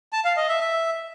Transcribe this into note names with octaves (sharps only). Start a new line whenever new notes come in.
A5
F5
D#5
E5
E5